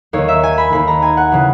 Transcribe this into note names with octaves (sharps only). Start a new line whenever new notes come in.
D#2 D#3 C#5
E5
G#5
B5
D#2 D#3 B5
A#5
G#5
F#5
C#3 E3